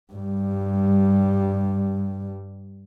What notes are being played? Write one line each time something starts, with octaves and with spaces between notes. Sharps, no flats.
G2 G3